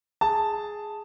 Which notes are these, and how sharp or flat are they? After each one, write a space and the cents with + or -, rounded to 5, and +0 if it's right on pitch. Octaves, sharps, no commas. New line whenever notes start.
G#4 +0 A5 +0